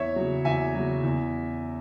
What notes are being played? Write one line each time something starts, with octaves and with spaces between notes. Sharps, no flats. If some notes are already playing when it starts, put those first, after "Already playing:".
Already playing: E2 C#5 E5
C#3 F#3
E2 E5 G#5
C#3 F#3
E2